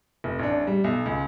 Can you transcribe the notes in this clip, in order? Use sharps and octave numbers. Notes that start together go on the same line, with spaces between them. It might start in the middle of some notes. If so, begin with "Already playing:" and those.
F1
A1 D4
G3
B1
C#2